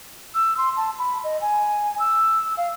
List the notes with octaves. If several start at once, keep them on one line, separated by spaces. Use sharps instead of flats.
E6
C6
A5
B5
D#5
G#5
E6
F5